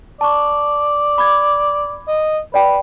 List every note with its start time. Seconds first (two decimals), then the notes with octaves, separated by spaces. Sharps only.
0.21 D5 A5 C#6
1.18 B5 D6 G#6
2.08 D#5
2.54 B4 D5 G5